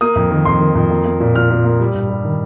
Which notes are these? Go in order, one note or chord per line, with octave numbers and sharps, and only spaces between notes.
A#3 D#6
F2
D#3
F2 C6
D#3
F2
A#3
A#3
A#2
A#2 F6
A#2
A#3
G3
G2
G3
D#3